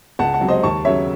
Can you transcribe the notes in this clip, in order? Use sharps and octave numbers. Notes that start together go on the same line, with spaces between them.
C#2 F#5 A5
F#5 A5
C3 F#3
C5 D#5
D#2 A5 C#6
C#3 F#3 C#5 E5